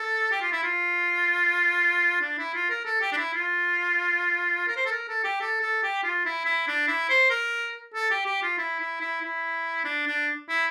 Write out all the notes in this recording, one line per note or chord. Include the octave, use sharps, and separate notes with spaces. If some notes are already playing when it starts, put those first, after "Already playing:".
Already playing: A4
G4
F4
E4
F4
D4
E4
F4
A#4
A4
G4
D4
E4
F4
A#4
C5
A4
A#4
A4
G4
A4
A4
G4
F4
E4
E4
D4
E4
C5
A#4
A4
G4
G4
F4
E4
E4
E4
E4
D4
D4
E4